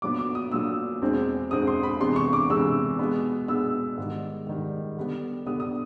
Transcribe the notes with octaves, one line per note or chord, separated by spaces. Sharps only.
A#2 F#3 B3 D6
D6
D#6
A#2 F#3 B3 E6
E2 B2 G#3 C4
E2 B2 G#3 C4 D#6
C6
B5
C3 E3 G#3 B3 C6
C#6
D6
C3 E3 G#3 B3 E6
B2 G#3 B3
B2 G#3 B3 E6
G#2 D#3 G3
G#2 D#3 G3
D3 G3 B3
D3 G3 B3 D#6
D#6